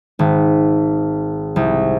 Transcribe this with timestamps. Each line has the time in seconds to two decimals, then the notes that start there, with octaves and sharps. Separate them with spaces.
0.19 G#1
1.56 C2